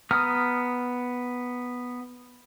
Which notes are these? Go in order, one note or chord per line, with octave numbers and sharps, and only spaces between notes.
B3 A#5 D#6 F6